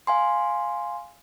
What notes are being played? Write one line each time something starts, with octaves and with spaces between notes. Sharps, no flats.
F5 G#5 C6